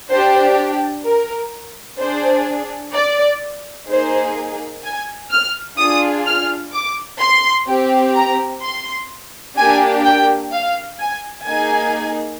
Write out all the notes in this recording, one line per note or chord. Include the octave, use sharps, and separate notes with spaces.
D4 G4 C5
A#4
D4 G#4 C5
D5
A#3 D#4 G#4 C5
G#5
F6
D4 F4 G#4 D#6
F6
D6
C6
C4 G4
A#5
C6
A#3 D4 G4 G#5
G5
F5
G#5
A#3 D#4 G#4 G#5